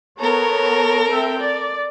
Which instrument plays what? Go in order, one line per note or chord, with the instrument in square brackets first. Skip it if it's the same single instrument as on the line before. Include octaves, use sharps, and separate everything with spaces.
[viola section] B3 C#5 A#5 [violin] A4 A#4
[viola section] C4 E5 G5
D5